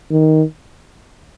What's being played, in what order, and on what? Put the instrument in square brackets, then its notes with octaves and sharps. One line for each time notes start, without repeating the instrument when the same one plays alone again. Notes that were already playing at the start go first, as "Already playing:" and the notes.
[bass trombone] D#3